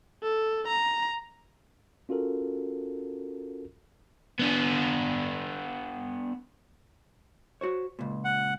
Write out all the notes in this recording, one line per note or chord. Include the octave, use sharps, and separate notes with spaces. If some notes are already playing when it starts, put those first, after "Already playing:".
A4
A#5
C#4 F4 F#4 A4 A#4
B3 D4
F#4 C5 C#5
C#2 A#2
F#5